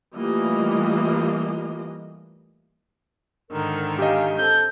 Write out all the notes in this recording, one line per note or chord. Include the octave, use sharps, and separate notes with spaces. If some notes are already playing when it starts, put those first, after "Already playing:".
E3 G3 A3 A#3 F4 D#5
G#2 D3 D#3 A#4
G4 D#5 F5 G5 G#5
C4 A4 G6